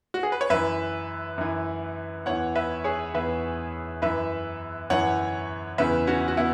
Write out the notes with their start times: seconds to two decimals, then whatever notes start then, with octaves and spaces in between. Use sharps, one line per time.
0.14 F#4
0.23 G#4
0.32 B4
0.41 C#5
0.50 F#2 E3 B4 E5
1.38 F#2 E3
2.26 E2 E3 C#5 F#5
2.55 B4 E5
2.84 G#4 C#5
3.14 E2 E3 B4 E5
4.02 F#2 E3 B4 E5
4.90 F#2 E3 C#5 F#5
5.78 E2 C#3 E3 B4 E5
6.07 C#4 F#4
6.28 F#4
6.37 B3 E4